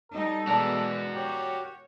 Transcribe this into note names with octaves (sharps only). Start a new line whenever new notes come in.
G3 D#4 A4 D#5
B2 E3 G#3 D4 F#4 A#4 D5 A5
G4 C#5